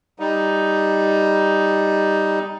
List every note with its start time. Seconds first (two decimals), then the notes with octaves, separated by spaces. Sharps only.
0.19 G3 D#4